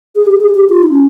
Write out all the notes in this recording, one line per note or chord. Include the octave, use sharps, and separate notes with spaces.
G#4
G4
G#4
G4
F4
D#4
C#4